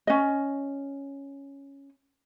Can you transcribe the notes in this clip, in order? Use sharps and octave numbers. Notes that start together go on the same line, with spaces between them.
C#4 D#5